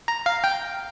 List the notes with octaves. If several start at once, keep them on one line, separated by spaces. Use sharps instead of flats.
A#5
F5
G5